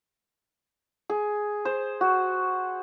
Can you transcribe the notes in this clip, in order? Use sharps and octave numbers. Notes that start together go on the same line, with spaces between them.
G#4
C5
F#4